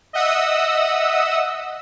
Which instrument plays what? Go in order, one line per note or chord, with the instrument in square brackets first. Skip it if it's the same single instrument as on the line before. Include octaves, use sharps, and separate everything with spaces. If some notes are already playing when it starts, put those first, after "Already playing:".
[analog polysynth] D#5 E5 F#5 D#6 E6